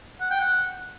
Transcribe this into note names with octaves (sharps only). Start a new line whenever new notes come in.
F#5
G5
F#5